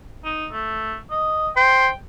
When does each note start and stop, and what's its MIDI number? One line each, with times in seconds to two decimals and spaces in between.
0.25 0.46 63
0.52 0.96 57
1.11 1.49 75
1.57 1.88 72
1.57 1.93 79